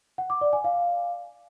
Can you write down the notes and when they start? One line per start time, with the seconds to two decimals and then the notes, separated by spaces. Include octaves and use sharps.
0.18 F#5
0.30 D6
0.41 D5
0.53 G#5
0.64 F5